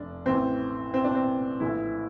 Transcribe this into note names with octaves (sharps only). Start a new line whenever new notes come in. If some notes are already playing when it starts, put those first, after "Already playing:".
Already playing: F1 D4
A1 A2 E3 C4
C4
D4
C4
A#1 A2 E3 E4